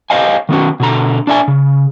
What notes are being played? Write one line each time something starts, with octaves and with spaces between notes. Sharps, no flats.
G4 C5 C#5 D#5 F5 G#5
D#3 B3 C#4 F#4
B2 D3 A#5
D4 D5 E5 G#5
C#3